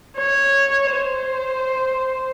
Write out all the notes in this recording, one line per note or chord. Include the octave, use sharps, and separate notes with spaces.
C#5
C5